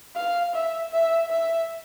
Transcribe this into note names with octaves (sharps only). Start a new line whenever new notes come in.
F5
E5
E5
E5